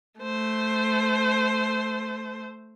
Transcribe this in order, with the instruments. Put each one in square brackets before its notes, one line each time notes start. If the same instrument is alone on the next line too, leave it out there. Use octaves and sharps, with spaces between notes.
[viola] A3 C5